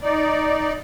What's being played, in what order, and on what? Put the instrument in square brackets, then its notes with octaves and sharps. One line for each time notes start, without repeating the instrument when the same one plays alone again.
[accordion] D#4 D5